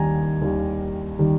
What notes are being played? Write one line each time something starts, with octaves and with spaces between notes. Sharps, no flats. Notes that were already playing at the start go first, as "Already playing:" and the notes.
Already playing: D#2 D#3 G3 G#5 A#5
D#2 D#3 G3
D#3 G3